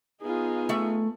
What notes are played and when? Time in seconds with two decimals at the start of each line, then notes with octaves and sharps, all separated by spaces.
0.22 B3 D#4 F4 G#4
0.69 A3 E5